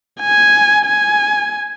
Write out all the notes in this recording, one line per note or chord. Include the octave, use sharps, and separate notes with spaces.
G#5
G#5